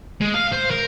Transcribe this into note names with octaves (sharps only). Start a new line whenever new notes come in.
G#3
F5
C5
A#4